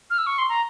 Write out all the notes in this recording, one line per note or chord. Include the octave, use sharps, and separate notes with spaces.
F6
E6
C#6
C6
A#5